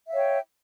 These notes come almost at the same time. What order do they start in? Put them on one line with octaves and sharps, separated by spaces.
E5 F5 C#5 G5